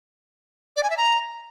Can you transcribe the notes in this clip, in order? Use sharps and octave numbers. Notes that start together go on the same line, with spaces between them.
D5
G#5
E5
A#5